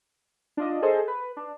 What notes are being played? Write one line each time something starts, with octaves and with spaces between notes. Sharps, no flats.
D4 F4 D#5
G#4 A4 C5 D#5
B4
D4